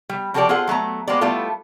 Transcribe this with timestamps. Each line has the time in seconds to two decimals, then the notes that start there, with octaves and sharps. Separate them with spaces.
0.09 G3
0.34 F3 F#4 G4 A4 C5 D5
0.49 F4 G#4 A4 C5 F#5
0.67 F#3 A3 B3 A#5
1.08 G#3 A#3 B3 G4 C5 D5
1.21 G3 A3 B3 E4 F4 A4